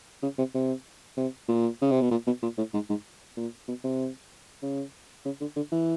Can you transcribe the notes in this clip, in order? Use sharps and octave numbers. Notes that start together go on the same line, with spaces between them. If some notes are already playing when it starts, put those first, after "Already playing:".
C#3
C3
C3
C3
A#2
C#3
C3
B2
A#2
B2
A#2
A2
G#2
G#2
A#2
B2
C3
C#3
C#3
D3
D3
E3